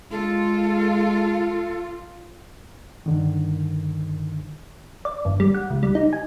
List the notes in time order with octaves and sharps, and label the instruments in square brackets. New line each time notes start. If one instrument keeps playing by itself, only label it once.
[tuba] G#3 [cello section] F4 [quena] A4
[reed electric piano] G2 D3 D#3
[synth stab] D5
G1
G3
F#5
C#2
G3
D#4
G#5